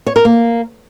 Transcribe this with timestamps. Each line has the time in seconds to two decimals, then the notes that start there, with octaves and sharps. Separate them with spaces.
0.07 C#5
0.16 A#4
0.25 A#3